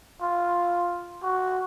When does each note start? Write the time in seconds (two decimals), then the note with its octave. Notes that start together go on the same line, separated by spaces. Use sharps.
0.22 F4
1.23 F#4